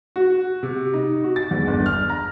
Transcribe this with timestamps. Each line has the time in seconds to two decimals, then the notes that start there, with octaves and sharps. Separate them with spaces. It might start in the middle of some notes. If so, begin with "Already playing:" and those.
0.16 F#4
0.63 C3
0.94 D#4
1.24 F#4
1.36 A6
1.51 E2
1.67 G1
1.86 F6
2.10 A#5